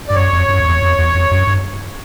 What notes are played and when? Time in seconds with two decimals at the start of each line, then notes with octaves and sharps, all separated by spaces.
0.08 G2 D5
0.16 F#2 C#5
0.32 F2
0.49 F#2
0.60 F2
0.66 E2
0.82 F2
0.98 E2
1.14 F2
1.31 F#2
1.47 G2